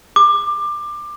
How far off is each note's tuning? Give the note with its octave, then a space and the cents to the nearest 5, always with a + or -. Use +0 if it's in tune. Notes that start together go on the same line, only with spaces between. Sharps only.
D6 +20